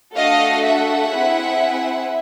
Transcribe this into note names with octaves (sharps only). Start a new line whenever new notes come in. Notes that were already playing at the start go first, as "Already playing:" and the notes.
A3 D4 F#4 A4 D#5 F5
E5 F#5
C4 E4 G#4